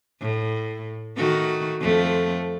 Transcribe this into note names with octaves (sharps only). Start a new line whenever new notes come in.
A2
D#3 A3 F#4
F2 A3